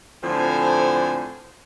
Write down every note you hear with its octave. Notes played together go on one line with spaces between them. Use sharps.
A2 D3 F3 C4 C5 G#5